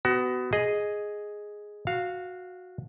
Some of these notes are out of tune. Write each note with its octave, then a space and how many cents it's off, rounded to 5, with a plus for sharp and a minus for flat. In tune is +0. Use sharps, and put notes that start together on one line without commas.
B3 +25 F#4 +25
G#4 +0 D#5 +0
F#4 -15 F5 +0